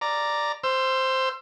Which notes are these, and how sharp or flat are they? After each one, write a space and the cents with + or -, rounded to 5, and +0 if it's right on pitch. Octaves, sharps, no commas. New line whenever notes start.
D5 +0 A#5 +0
C5 +0 E6 +30